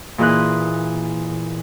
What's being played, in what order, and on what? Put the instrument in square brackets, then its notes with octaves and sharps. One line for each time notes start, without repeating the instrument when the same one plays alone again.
[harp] A#2 E3 G#4 D#5 C6 F#6